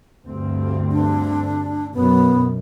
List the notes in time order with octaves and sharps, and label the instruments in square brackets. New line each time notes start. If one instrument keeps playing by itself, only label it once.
[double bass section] D2 G2 C4
[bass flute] D4
[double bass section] F#2 B2 F#3 [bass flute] B3